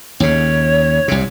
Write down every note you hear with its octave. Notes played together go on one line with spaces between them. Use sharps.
D#2 C#3 C#5
C2 C3